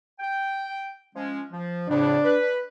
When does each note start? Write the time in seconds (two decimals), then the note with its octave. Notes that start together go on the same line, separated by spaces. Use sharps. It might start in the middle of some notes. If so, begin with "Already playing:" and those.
0.20 G5
1.15 F3 G#3 C#4
1.52 F3
1.89 F2 A2 C#3 D4
2.24 B4